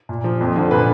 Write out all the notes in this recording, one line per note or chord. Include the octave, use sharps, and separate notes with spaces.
A#2
F3
F2
D3 F3
A#2 B4